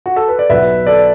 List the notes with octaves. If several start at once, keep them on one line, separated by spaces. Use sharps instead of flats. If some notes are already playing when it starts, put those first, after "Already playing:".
F#4
A4
B4
D5
B1 B2 F#3 B4 E5
A4 D5